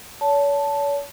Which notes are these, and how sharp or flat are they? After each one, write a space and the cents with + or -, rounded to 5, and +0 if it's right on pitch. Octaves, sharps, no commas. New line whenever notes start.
C#5 +40 A5 +0